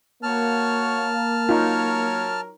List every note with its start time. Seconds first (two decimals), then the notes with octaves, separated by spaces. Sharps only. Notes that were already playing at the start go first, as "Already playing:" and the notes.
0.23 A#3 F#4 C#5 A5 F6
1.49 F#3 D#4 F4 A#4 C#5